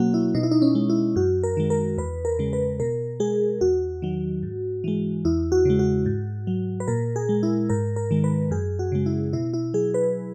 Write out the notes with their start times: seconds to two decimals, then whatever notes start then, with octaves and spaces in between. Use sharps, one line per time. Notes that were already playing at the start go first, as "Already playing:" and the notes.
Already playing: B2 F#3 A#3 C#4 F#4
0.14 E4
0.35 B2 D#4
0.43 E4
0.51 D#4
0.62 C#4
0.75 G#3
0.90 E4
1.16 F#2 F#4
1.43 A#4
1.57 D#3 G#3
1.70 A#4
1.98 E2 B4
2.25 A#4
2.39 C#3 G#3
2.53 B4
2.80 B2 A#4
3.20 G#3 G#4
3.61 E2 F#4
4.02 D#3 F#3
4.43 G#2
4.84 E3 G#3
5.25 E2 E4
5.52 F#4
5.65 C#3 G#3
5.79 F#4
6.06 G#2
6.47 F#3
6.80 B4
6.88 A#2 A#4
7.16 G#4
7.29 G#3
7.43 E4
7.70 G#2 A#4
7.96 A#4
8.11 D#3 G#3
8.24 B4
8.51 F#2 G#4
8.79 F#4
8.92 C#3 G#3
9.06 E4
9.33 B2 E4
9.54 E4
9.74 F#3 G#4
9.94 B4